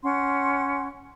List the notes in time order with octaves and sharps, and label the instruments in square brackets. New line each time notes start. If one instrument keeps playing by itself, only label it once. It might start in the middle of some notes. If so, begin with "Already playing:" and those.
[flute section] C#4 F#5 C6